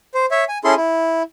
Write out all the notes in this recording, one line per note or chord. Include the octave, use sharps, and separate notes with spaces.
C5
C#5 E5
G#5
C#4 E4 G#4 A4 C6
E4